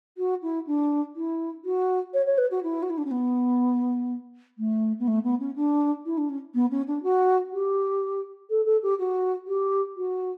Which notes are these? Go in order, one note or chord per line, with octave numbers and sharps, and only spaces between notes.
F#4
E4
D4
E4
F#4
C#5
C#5
B4
F#4
E4
F#4
E4
D4
C#4
B3
A3
B3
A3
B3
C#4
D4
E4
D4
C#4
B3
C#4
D4
F#4
G4
A4
A4
G4
F#4
G4
F#4